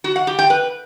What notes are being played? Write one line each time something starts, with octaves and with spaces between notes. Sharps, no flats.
F#4
F#5
G4
G5
B4